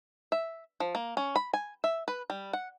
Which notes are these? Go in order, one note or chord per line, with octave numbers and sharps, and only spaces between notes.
E5
F3
A#3
C#4
B5
G#5
E5
B4
G3
F#5